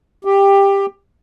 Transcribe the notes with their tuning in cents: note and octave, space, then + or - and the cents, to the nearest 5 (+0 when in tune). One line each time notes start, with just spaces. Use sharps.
G4 +15